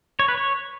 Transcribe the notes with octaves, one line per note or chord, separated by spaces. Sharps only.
C#5
B4
C#5